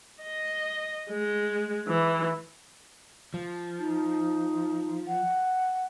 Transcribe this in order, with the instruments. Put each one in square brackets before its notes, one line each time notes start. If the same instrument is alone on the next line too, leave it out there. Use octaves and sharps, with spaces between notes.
[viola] D#5
G#3
E3
[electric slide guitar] F3
[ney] D#4
F#5